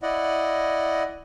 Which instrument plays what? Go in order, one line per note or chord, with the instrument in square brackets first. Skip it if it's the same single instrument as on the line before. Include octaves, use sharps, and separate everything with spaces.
[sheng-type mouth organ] E4 D5 D#5 F#5